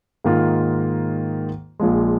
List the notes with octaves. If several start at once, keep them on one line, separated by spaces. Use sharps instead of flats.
G#2 D#3 A#3 F4
A#1 A#2 F3 G#3